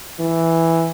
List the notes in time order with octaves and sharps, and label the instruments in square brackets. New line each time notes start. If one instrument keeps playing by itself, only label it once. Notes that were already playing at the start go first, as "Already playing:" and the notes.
[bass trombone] E3